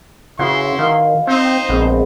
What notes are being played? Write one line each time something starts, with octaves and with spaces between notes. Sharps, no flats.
C#3 E4 F#4 B4 F#5 C6
D#3 F5
C4 D#4 C5
A#1 G#3 B3 C4